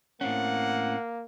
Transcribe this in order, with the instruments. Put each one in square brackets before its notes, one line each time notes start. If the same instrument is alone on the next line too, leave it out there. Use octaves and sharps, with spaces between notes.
[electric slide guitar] A2 C4 C#4 [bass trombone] A#3 [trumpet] F#5